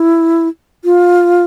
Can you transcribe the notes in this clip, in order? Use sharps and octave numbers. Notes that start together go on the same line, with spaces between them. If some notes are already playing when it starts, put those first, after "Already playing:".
Already playing: E4
F4